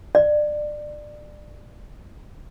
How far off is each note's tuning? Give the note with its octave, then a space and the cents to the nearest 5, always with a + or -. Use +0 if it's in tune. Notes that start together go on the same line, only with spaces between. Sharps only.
D5 +25